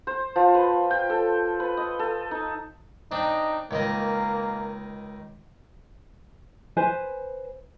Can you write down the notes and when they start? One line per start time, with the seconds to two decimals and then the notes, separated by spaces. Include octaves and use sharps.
0.07 C5
0.36 F3
0.55 B4
0.91 G5
1.10 A4
1.60 B4
1.77 D#5
1.99 A4
2.31 D#4
3.12 C4 D4 D#4
3.71 C#2 D#3 A#3 D#5
6.77 B4 C5 G#5